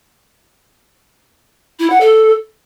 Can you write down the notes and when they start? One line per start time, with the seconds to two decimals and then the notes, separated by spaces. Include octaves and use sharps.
1.79 E4
1.90 F#5
2.01 A4